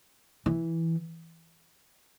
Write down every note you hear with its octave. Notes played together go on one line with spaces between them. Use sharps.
E3